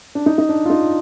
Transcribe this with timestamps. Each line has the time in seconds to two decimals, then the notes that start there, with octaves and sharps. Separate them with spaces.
0.15 D4
0.26 D#4
0.38 D#4
0.49 D4
0.65 F4
0.70 D#4